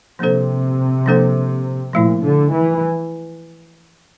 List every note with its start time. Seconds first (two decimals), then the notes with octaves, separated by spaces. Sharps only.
0.19 C3 F3 A#3 D4 A4 C5
1.06 F3 A#3 D4 A4 C5
1.93 A#2 F3 A3 E4
2.23 D3
2.51 E3